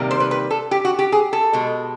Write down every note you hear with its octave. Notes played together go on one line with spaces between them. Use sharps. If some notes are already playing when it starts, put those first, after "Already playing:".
Already playing: C3 D#3 G3 A#3
C5
B4
B4
A4
G4
F#4
G4
G#4
A4
B2 G#3